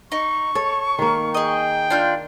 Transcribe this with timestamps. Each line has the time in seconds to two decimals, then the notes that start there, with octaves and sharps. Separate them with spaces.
0.12 D#4 C#6
0.55 A4 C#5
0.99 D#3 A#3
1.34 G#4 D#5 G5
1.90 D4 F4 G6